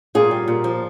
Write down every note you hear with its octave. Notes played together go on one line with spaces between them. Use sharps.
A#2 F4 G#4
G3
A#2
F3